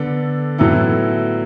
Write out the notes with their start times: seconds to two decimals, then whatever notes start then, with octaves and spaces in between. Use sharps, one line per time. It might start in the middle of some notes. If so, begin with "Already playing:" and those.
Already playing: D3 B3 D4 A4
0.58 A2 F#3 B3 E4 A4